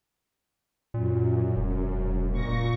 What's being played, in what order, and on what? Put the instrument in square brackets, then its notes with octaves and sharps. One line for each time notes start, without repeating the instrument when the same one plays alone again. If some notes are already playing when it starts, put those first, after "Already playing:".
[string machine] F#2 [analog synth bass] A#2
[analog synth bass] E1
[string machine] A#2 C#6 A#6